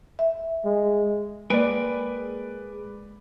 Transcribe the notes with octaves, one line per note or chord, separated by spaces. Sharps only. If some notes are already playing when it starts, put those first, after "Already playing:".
E5
G#3
G#3 A#3 G#4 B4 D5 G5 G#5